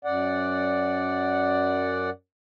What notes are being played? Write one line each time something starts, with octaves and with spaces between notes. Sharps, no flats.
F#2 D5 F#5